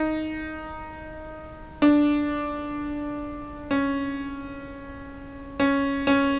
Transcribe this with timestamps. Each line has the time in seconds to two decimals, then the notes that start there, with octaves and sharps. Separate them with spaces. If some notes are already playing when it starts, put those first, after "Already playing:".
Already playing: D#4
1.82 D4
3.71 C#4
5.60 C#4
6.07 C#4